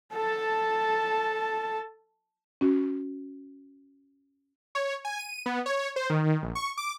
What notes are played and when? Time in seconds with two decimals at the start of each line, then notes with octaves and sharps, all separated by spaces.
0.13 A4 A5
2.61 C#4 F#4
4.75 C#5
5.05 G#5
5.19 D#7
5.46 B3
5.66 C#5
5.96 C5
6.10 D#3
6.43 A#1
6.55 C#6
6.78 D6